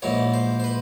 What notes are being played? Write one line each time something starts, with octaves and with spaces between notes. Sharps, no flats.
A#1 G#2 E3 C#5
C5
C5
B4